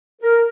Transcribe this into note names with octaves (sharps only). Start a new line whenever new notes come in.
A#4